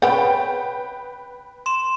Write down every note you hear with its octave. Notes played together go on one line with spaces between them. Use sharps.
C#3 C4 B4 F#5 G5
C6 E7